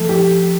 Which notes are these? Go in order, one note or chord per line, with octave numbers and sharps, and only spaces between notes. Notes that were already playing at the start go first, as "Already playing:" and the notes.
Already playing: F3 A3
G4